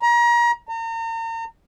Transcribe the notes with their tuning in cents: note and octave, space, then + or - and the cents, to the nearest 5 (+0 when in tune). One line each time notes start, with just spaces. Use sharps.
A#5 +30
A#5 -40